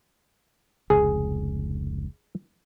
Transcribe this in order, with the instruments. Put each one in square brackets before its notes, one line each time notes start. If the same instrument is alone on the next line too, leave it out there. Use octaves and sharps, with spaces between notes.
[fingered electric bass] F1 C#2 [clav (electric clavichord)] G#4